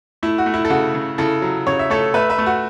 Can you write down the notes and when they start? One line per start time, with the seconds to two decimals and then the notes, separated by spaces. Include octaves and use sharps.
0.23 A3 E4
0.38 F#4
0.46 A3
0.54 E4
0.65 A4
0.70 C#3 F#4
0.95 C#3
1.18 C#3 E4 A4
1.42 F#3
1.67 C#3 C#5
1.79 E5
1.90 A3 A4 C#5
2.14 A3 B4 E5
2.30 B4 E5
2.38 A3
2.46 F#4